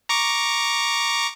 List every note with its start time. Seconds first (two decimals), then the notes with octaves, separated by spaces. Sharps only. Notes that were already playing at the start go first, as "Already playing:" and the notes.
0.09 A#5 C#6 D6